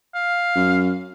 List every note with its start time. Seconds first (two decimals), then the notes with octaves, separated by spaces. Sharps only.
0.15 F5
0.56 F#2